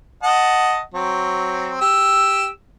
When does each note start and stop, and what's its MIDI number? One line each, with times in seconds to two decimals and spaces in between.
0.23 0.80 75
0.23 0.80 78
0.23 0.80 81
0.94 1.79 54
0.94 1.79 60
1.81 2.49 67
1.81 2.49 88